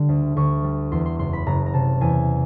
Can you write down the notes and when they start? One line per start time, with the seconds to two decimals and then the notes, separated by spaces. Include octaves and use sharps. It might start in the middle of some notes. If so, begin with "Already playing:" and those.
Already playing: D3 G3
0.09 D2
0.36 D2 C#6
0.64 G3
0.91 E2 C6
1.06 C6
1.19 F#1 C6
1.33 B5
1.46 F#1 A#5
1.66 A#5
1.74 C3 A5
2.01 E2 G#5